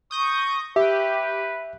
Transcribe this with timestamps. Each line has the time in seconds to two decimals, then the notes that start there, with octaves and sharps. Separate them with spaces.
0.11 C#6 D#6 G6 A#6
0.76 G4 B4 E5